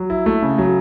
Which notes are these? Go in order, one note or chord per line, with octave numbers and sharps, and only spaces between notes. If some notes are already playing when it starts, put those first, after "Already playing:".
Already playing: F#3
E4
A3
C#3
F#3